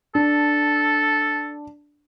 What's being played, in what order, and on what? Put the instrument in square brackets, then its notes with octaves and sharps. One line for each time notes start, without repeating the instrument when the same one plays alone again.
[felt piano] D4 [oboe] A4